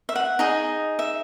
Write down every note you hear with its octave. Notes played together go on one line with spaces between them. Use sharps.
E5
F#5
D#4 G#4 D#5
E5